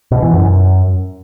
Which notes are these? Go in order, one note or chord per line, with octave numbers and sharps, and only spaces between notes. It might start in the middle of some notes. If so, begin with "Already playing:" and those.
B2
E3
F#2